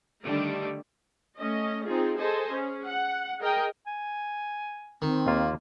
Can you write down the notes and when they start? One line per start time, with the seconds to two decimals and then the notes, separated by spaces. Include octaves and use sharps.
0.24 D3 D#3 G3 A3 D4
1.37 A3 C#4 D#5
1.85 C4 D#4 F4 G#4
2.17 G#4 A4 C5 D#5 G#5
2.52 C#4 G#4
2.86 F#5
3.40 G#4 A#4 D#5 G5
3.87 G#5
5.02 D#3 C4
5.27 D#2 A#3 F4